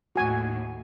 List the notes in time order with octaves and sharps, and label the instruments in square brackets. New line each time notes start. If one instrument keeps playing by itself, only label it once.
[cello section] D#2 A2 [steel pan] F#4 G#5